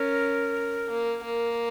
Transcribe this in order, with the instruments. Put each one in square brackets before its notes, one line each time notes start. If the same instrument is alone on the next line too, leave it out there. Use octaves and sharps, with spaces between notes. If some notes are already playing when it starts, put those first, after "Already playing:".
Already playing: [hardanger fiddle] C#4 [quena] A#4
[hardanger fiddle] A#3
A#3